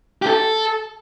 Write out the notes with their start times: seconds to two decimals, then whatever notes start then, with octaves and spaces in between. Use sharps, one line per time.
0.22 G4
0.27 A4